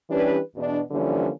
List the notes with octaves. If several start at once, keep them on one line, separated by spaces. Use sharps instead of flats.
E3 G3 C#4 D4 G4 B4
E2 B2 D4
D3 E3 F3 G3 A#3 C#4